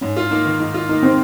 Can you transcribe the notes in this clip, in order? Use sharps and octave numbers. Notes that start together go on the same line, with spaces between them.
G#2 C#4
F4
A#3 D#4
D#3
G#2 D#4
F4
A#3 D#4
D#3 C4